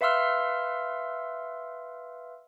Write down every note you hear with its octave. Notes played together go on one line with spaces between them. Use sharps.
B4 E5 F5 C6 E6 F6